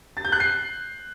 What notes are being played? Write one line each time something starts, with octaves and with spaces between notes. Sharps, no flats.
A6
G6
F#6
C7